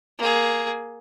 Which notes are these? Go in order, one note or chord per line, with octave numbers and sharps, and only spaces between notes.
A#3 G#4